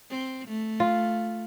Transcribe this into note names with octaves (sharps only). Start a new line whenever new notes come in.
C4
A3
F4